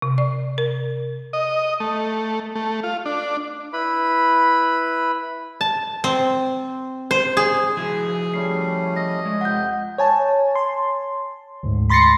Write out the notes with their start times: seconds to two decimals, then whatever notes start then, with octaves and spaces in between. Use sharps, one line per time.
0.02 C3
0.18 D5
0.58 A#4
1.33 D#5
1.80 A3
2.55 A3
2.83 F4
3.06 D4
3.73 E4 B4 B5
5.61 A5
6.04 C4
7.11 C5
7.37 G#4
7.77 F3 E4 F#4 G#4
8.34 G3 A3 C#4 C7
8.96 D#5 A#6
9.25 G#3
9.41 F2 C3 F#5 G6
9.98 C#5 G#5 A5
10.55 C6
11.63 D2 G#2
11.90 B5 C6 A6 A#6 C7 C#7